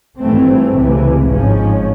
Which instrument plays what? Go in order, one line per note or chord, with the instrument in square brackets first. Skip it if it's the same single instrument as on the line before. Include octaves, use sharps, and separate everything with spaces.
[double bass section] G#1 G2 E3 A3 C4
C#2 C3 E3
G#1 G#2 F3 G#3 C#4